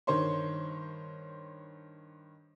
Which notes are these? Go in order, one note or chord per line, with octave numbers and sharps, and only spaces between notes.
G2 D#3 C5 C#5 C6